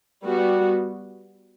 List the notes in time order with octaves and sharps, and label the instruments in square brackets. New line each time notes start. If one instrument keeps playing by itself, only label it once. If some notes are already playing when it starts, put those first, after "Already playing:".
[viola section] G3 B3 F#4